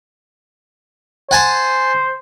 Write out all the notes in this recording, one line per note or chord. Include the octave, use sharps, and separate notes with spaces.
C5 F#5 G#5 A5